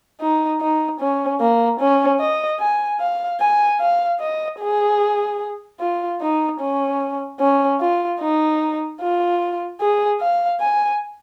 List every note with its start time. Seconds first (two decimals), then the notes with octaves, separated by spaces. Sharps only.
0.21 D#4
0.61 D#4
1.00 C#4
1.40 A#3
1.80 C#4
2.20 D#5
2.60 G#5
3.00 F5
3.40 G#5
3.80 F5
4.20 D#5
4.60 G#4
5.80 F4
6.21 D#4
6.60 C#4
7.40 C#4
7.80 F4
8.20 D#4
9.01 F4
9.80 G#4
10.21 F5
10.60 G#5